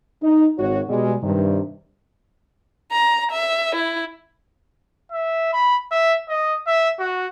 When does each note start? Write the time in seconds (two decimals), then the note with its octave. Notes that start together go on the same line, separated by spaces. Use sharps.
0.23 D#4
0.58 G#1 F#4 C#5
0.88 B2 G3 G#3
1.22 G2 C3 D#3
2.92 A#5
3.31 E5
3.76 E4
5.12 E5
5.53 B5
5.91 E5
6.29 D#5
6.67 E5
6.99 F#4